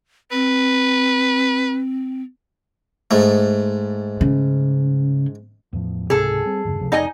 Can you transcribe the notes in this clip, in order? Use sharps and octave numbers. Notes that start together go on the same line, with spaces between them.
C4 B4
G#2 A3
C#3
E2 A2 F3
C#2 G#2 C3 G#4 A4
G3 C4
E2 G2 C#3
C#2 C3 F3
F1 D#4 D#5 G#5